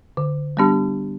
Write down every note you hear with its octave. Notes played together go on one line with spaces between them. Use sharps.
D3
G3 B3 D4 G4